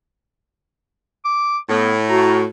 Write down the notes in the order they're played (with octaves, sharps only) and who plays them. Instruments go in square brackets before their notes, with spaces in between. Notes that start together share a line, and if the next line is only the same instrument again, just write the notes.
[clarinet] D6
[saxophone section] A2 [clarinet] B3
[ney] F#4 [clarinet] A#5